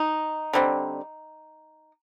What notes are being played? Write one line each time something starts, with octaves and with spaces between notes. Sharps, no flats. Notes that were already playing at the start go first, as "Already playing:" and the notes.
Already playing: D#4
D3 G3 C4